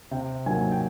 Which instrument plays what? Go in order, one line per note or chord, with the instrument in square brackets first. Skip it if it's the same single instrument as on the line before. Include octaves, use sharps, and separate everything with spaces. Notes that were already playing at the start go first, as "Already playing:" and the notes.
[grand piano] C3 G5
D#3 F#3 A#3 G#5
G5